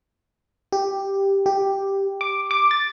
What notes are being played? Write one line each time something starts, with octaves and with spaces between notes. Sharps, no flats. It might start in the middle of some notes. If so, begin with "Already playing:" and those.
G4
G4
D6
D6
A6